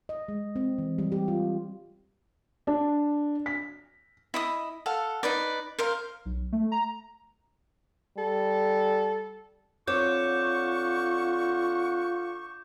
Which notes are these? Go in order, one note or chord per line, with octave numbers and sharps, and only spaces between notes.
D#5
G#3
C4
E3
G3
G4
F4
D4
B6
E4 D#5 D#6
A4 F5 F#5
D#4 B4 D5
A#4 C5 F5
B1
A3
A#5
G3 A4
D3 C4 F4 C#5 F#5 C#6 D6 G6